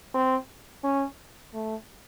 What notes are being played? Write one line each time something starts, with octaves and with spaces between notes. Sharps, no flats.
C4
C#4
A3